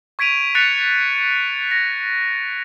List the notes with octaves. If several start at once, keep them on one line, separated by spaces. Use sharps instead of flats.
C#6 G#6 B6 D7 D#7 F7
F#6 A6 B6 C#7 F7
A#6